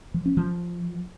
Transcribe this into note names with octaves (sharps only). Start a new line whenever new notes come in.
F3
C#4
F3